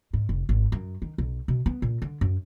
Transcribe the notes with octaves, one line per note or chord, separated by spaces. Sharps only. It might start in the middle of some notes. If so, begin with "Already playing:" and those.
G#2
F1
G#1
F#2
D#3
B1
B2
B3
A#2
D3
F#2